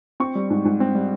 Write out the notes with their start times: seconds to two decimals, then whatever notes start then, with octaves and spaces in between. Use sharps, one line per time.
0.20 C4 C#6
0.35 G3
0.50 G#2
0.65 G#2
0.80 C4
0.95 G3